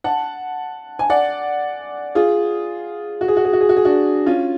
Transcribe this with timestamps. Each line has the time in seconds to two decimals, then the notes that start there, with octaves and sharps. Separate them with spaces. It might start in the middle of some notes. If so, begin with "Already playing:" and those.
0.04 F#5 A5
0.99 G#5
1.10 D5 F#5
2.15 F4 G#4
3.21 F#4
3.28 G#4
3.37 F#4
3.45 G#4
3.53 F#4
3.61 G#4
3.69 F#4
3.77 G#4
3.85 D4 F#4
4.26 C#4 F4